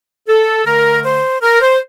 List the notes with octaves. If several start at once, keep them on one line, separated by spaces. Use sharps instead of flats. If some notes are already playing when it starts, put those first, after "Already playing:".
A4
D3 A3 A#4
C5
A#4
C5